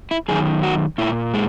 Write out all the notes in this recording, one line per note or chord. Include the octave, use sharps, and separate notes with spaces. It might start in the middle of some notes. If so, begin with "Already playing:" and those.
E4
F#2 D#3 G#4
F#4
A#2 E4
G#3